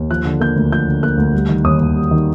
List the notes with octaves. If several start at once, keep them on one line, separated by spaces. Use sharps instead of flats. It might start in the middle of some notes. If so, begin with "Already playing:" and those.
Already playing: D#2
F3 F#6
D3
A#3 G6
D2
F3 G6
D3
A#3 F#6
D2
G3
D#3
D#2 D#6
D#2
G3
D#3